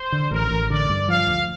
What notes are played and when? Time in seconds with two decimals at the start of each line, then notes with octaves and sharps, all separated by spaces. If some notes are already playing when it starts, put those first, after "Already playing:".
Already playing: C5
0.12 D3
0.31 A1 A#4
0.51 A1
0.70 D3 D5
0.89 G2
1.08 F3 F5
1.28 D2